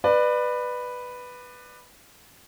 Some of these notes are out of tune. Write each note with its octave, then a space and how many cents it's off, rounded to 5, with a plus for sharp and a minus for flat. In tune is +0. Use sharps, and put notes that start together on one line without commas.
B4 +0 D5 +30